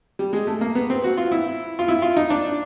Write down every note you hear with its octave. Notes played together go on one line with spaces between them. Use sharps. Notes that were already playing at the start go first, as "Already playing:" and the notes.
G3
G#3
A3
A#3
B3
C4
F#4
F4
E4
F4
E4
F4
D#4
D4